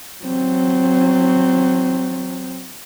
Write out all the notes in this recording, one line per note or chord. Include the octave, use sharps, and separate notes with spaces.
F#3 C4